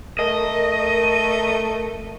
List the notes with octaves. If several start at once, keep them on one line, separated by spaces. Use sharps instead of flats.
A3 A#4 D#5